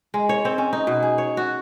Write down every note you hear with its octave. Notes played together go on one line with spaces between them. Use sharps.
G#3
C#5
C4
C#4
D#4
B2
G#4
C#5
F#4